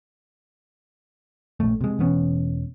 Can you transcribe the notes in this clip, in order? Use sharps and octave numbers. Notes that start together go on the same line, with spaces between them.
A#1 A3
C3 G#3
E1 E2 B3 C#4